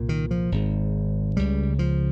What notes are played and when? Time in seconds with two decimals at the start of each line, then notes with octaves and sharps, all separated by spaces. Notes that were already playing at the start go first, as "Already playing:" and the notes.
Already playing: C2 A#2
0.09 D#3
0.31 F3
0.52 G#1 G#2
1.37 C#2 C#3 G3
1.79 F3